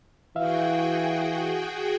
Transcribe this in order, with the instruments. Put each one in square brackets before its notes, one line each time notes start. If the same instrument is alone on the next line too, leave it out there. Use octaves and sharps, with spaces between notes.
[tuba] E3 [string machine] F#4 G#4 G5 [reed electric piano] E5 F5